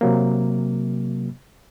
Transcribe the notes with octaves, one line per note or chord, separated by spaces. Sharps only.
C3 F#3 A#3